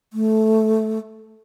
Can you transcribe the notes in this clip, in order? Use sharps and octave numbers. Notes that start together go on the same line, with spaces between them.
A3